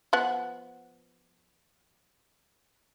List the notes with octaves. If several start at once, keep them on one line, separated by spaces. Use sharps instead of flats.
F3 B3 F#5